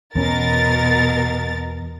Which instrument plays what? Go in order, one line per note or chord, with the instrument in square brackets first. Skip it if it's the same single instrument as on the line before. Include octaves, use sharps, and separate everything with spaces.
[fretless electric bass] E2 C#4 [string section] B2 A#4 A6